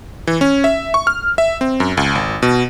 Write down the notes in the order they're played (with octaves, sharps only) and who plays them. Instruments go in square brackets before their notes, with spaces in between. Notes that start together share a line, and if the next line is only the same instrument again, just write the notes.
[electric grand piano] E3
C#4
E5
C#6
F6
E5
C4
F#2
C#2
G#1
B2